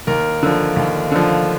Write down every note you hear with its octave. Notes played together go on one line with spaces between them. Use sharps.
D#2 A#4
D3 F3
D#2
D3 F3